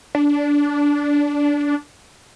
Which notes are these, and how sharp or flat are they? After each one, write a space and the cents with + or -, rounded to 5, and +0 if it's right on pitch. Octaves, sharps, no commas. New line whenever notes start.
D4 -15